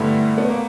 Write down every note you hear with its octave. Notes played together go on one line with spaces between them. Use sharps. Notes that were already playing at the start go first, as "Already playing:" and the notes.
Already playing: G2 D3 G3 A3 B3 E4
B3
A#3